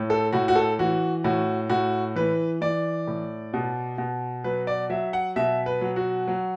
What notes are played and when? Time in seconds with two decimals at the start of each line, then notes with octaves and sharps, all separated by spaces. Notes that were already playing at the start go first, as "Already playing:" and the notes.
Already playing: A2
0.10 A4
0.33 A2 F#4
0.48 F#4
0.56 A4
0.79 E3 F#4
1.24 A2 F#4
1.70 A2 F#4
2.16 E3 B4
2.61 E3 D5
3.07 A2
3.54 B2
3.98 B2
4.44 F#3 B4
4.67 D5
4.90 F#3 E5
5.13 F#5
5.36 B2 E5
5.66 B4
5.81 F#3
5.96 F#4
6.28 F#3